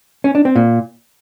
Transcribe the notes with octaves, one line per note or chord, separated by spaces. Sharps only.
C#4
D4
C4
A#2